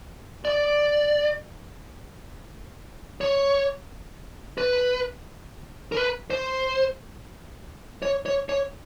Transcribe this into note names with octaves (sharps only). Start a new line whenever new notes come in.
D5
C#5
B4
A#4
B4
C5
C#5
C#5
C#5